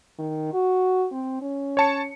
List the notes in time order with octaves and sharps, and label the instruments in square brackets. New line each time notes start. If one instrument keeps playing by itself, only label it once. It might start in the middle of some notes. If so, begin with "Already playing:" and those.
[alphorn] D#3
F#4
C4
C#4
[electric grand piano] C#5 A5 C#7